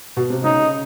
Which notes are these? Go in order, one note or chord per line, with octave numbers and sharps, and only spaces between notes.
B2
C3
C#3 D#4